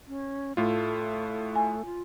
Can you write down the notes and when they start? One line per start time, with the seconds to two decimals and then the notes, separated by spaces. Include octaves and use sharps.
0.07 C#4
0.57 A2 A3 F4
1.56 G#5
1.85 F4